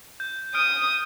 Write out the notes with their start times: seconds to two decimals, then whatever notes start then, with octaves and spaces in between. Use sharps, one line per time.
0.20 G6
0.55 D#6 F6 D7 D#7